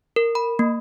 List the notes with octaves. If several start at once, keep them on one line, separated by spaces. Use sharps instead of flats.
A#4
B5
A#3